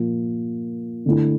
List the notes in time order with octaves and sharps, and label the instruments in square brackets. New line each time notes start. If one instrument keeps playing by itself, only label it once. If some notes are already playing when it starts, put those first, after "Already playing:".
Already playing: [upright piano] A#2 F3 A#3
D3 A3 E4